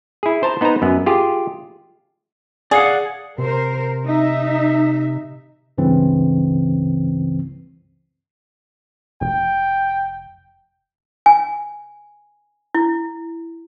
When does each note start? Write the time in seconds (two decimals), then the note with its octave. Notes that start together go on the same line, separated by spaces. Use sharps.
0.23 E4 G#4
0.43 C5 A5 A#5
0.61 B3 D#4 B4 C5 A#5
0.82 F#2 B3
1.06 F4 G4 G#4
2.71 G#4 D5 F5 F#5
3.38 C3 A#4 C5
4.06 D#4 E5
5.78 C#2 G2 C#3 E3 C4
9.21 F1 G5
11.26 G#5
12.75 E4